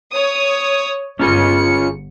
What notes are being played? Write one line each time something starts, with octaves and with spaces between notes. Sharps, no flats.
C#5 D#6
G1 C#4 F4 G#4 C#7